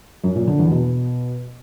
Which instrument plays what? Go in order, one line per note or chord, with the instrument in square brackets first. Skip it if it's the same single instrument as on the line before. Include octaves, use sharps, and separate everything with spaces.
[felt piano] F#2
A#2
D3
E2
B2